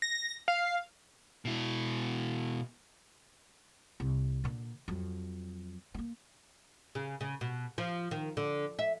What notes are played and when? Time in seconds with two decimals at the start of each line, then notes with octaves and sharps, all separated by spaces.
0.02 A#6
0.48 F5
1.45 B2 E4
4.00 C2
4.44 A#2 D3
4.88 F2 F#3
5.94 A3 A#3
6.95 C#3
7.21 C#3
7.41 B2
7.78 F3
8.11 D#3
8.37 D3
8.79 E5